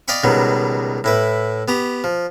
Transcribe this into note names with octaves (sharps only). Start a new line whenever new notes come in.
D5 D#5 F5 G5 B5 C#6
C#2 B2 D#3 F#3 G3
A2 E4 B4
B3 G4 A#5
F3